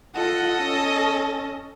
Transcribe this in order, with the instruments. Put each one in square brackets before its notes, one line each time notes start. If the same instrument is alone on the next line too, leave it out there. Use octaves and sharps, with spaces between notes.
[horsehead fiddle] F4 F#5 [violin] A4 D#5
[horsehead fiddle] C#4